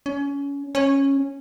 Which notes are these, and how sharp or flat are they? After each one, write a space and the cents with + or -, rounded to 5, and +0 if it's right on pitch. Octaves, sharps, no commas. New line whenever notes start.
C#4 +25
C#4 -10